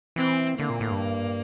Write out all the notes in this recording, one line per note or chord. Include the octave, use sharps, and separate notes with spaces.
E3 C4
D3 A#3
A#2
A2
G2